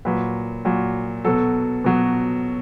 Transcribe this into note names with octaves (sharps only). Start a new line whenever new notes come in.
A#2 F#3 B4
A#2 F#3
B2 F#3 A4
B2 F#3